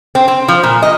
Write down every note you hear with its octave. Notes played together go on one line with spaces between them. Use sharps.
C4
C4
F3
A#2
D#5